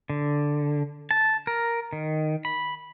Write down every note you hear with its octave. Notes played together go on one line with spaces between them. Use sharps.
D3
A5
A#4
D#3
B5